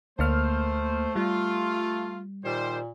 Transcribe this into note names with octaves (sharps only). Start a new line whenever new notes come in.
D2 A3 A#3 C5 F6
G3 F4
A#2 D#3 G3 C5